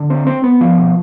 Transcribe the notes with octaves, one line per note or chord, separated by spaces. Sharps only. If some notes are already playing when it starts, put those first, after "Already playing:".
Already playing: D3
C4
C4
B3
F3
B2